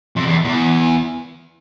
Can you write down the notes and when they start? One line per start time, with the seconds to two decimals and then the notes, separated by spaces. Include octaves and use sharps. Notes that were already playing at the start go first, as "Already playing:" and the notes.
0.16 F2
0.26 E2
0.44 E2